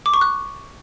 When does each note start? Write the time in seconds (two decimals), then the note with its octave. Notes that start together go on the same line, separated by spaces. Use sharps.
0.06 D6
0.14 C#6
0.21 F#6